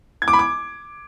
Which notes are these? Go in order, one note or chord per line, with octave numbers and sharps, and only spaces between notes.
G#6
D6
B5
D6